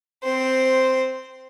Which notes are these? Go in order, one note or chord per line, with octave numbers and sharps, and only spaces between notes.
C4 C5